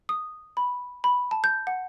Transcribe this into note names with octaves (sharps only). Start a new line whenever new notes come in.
D#6
B5
B5
A5
G6
F#5